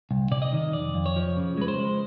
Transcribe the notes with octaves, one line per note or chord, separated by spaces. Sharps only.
C2
C3 D5
D#5
D#3
F2 D5
F2
C#5
F3
C#3
G#3 B4
C5
G#3